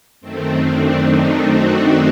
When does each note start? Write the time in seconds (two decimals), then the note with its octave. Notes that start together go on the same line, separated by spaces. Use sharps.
0.21 F#2 D#3 A3 C4
0.62 D4
1.03 D#4
1.44 F#4